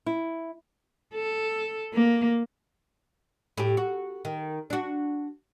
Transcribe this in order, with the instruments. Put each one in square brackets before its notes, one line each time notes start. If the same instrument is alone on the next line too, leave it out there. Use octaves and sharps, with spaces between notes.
[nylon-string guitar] E4
[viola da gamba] A4
A#3
[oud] A2 G4
F#4
D#3
D4 F#4